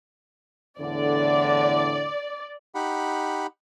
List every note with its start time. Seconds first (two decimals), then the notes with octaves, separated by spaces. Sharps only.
0.80 E2 A2 D3 D5
2.75 D#4 G4 F#5 B5